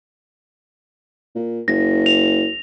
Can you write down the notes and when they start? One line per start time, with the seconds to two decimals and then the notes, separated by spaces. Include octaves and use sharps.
1.35 A#2
1.68 F#1 A#6
2.06 F7